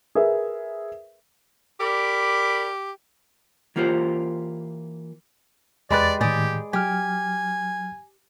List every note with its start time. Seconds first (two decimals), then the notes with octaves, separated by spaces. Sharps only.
0.15 G#4 A#4 B4 E5
1.80 G4 A#4 D5 B5
3.76 E3 A#3 F4 G4 C5
5.90 E2 G#3 G4 B4 D5 B5 A6
6.21 A2 D#3 G4 G#4 D5
6.73 F#3 G4 G#5 F6